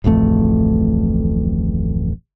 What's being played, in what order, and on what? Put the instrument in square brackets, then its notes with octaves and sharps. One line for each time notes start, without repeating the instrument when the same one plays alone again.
[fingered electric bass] D1 A1 F2 A3